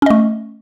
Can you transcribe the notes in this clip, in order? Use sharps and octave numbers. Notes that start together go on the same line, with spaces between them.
A3 C#4 D#5